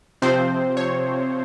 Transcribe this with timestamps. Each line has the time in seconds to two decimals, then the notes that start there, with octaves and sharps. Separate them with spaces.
0.22 C3 F3 C4 C5
0.77 C#5